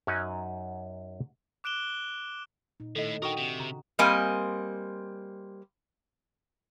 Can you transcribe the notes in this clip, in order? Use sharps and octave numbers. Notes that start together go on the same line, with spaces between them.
F#2 F#3 C#4 D#4 F#5 G#5
D6 F#6 D7 E7 G7
A#2 D#4
A2 D#3 A4 D#5
D4 D#4 F#4 A#4 G5 C#6 D#6
C3
C#3 A#5
G3 A#3 C4 D#5 G#5